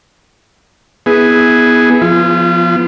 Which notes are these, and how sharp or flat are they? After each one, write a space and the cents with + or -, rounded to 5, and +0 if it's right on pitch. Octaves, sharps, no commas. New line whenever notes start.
B3 +0 E4 -20 G#4 +0
F3 +0 B3 +0 F4 -35